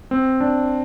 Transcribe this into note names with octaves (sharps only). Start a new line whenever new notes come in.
C4
D4